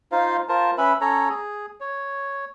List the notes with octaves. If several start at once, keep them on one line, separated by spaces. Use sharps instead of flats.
D#4 F4 C5 F5
F4 A#4 C5 A5
C#4 B4 E5 B5
C#4 A4 C#5 A#5
G#4
C#5